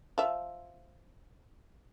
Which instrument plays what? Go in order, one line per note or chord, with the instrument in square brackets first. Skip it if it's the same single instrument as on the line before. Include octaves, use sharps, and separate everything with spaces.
[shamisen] F3 E5